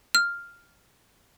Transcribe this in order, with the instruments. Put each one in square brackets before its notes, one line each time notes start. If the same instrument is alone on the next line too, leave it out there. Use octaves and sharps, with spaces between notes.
[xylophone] F6